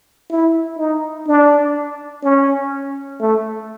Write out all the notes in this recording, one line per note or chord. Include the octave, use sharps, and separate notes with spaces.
E4
D#4
D4
C#4
A3